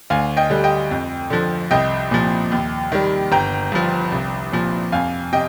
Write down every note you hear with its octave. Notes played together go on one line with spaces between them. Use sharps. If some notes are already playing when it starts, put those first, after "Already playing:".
D2 F5 G#5
D#5 G5
D3 G3
D#5 G5
F2
D3 F3
C2 D#5 G5
A#2 F3
D#2
D#3 G3
G1 G5 A#5
G2 F3
C2
A#2 F3
F2 F5 G#5
C3 D#5 G5